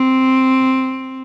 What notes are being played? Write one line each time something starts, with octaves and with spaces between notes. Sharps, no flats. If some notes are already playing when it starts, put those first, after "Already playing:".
Already playing: C4